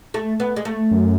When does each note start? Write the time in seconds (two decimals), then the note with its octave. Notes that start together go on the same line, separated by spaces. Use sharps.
0.14 A3
0.40 B3
0.56 G#3
0.65 A3
0.91 F#2